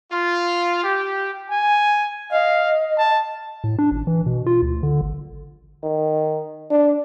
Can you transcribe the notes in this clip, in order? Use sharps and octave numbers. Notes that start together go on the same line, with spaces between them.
F4
G4
G#5
D#5 F5
A5
A2
D4
G#1
E3
B2
F4
D2
D3
G#1
D#3
D4